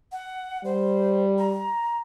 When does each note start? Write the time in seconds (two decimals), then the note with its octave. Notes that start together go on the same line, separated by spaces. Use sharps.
0.12 F#5
0.65 G3 C5
1.38 A#5